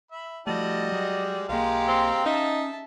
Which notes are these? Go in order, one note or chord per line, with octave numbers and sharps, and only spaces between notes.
E5 B5
F3 G3 A3 E4 F#4 D#5 A5
F#3 G#3
B1 G#3 A#3 G4 F5 A#5 C6
C4
C#4 D#4 E5 A5